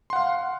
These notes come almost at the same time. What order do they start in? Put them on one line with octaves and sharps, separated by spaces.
C6 F#5 F5